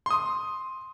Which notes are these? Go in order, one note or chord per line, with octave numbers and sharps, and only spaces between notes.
C6 D#6